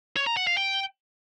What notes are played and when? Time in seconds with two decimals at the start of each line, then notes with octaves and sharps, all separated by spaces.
0.16 C#5
0.27 A#5
0.37 F#5
0.47 F5
0.57 G5